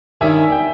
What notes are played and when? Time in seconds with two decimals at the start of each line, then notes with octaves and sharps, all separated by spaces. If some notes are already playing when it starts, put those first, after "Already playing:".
0.21 G2 D#3 G3 C#4 E5 G#5
0.52 G5